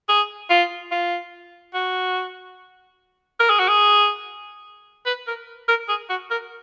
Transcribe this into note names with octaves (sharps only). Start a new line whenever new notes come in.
G#4
F4
F4
F#4
A#4
G#4
F#4
G#4
B4
A#4
A#4
G#4
F#4
A#4